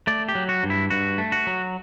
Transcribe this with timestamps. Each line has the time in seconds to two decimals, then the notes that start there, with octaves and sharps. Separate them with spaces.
0.07 A3 D5
0.29 G4
0.35 F#3
0.49 F#4
0.64 G2
0.70 E4
0.90 G2 F#4
1.18 A3
1.32 F#4
1.47 F#3